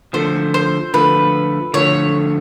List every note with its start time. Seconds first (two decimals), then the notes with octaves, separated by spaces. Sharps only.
0.13 D3 F3 A3 C5
0.54 C5
0.94 D3 F3 A3 B4
1.74 D3 F3 A3 C#5